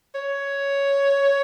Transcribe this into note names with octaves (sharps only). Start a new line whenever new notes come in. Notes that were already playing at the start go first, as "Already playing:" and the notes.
C#5